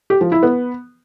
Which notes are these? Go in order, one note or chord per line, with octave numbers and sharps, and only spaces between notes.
G4
F3
E4
B3